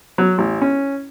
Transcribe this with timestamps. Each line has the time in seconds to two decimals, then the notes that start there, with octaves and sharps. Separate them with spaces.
0.18 F#3
0.38 A1
0.61 C#4